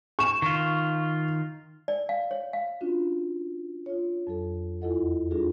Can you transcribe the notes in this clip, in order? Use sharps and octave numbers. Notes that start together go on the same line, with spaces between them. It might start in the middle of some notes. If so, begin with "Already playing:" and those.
C#6 E7
D#3 F4
D5
F5
C#5
F5
C#4 D4 F4 F#4
F4 C#5
F2 F#3 A4
E2 E4 F4 A4 D#5 F#5
G3 D4 F4 F#4 G#4 A4